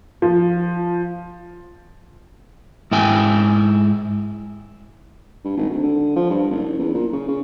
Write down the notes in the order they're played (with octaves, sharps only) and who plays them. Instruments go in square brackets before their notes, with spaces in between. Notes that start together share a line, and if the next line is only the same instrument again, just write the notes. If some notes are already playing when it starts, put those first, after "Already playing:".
[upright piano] F3
[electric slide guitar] G#2 E4 G5 G#5
[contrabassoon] G2
G#1
D2
D3
F3
G2
F#1
E2
A#2
C#3
C#3